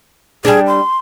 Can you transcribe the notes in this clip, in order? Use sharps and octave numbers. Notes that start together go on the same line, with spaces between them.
G3 D4 G#4
C6